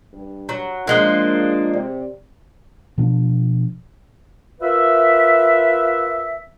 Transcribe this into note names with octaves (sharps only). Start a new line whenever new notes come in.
G2
F#3 A#5
F3 G#3 A#3 D4 F#6 G7
C3 D5
B2 F3 D4
F4 A#4 B4 D5 E5